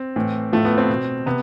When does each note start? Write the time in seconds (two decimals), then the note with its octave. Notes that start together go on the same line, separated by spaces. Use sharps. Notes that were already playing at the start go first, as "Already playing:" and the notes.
Already playing: C4
0.16 A2 E3
0.53 A2 F3 A3
0.65 B3
0.78 C4
0.90 B2
1.26 C3 B3